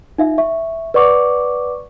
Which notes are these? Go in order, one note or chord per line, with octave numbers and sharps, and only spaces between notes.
D#4 F4 E5 F5
E5 C#6
B4 D5 F#5 C#6 D6